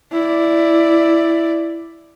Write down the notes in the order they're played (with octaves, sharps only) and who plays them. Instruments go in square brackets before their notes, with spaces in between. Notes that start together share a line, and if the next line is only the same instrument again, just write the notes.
[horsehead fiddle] E4 D5